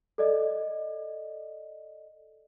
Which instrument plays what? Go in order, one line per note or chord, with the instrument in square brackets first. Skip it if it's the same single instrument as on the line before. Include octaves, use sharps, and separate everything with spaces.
[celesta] A4 D5 D#5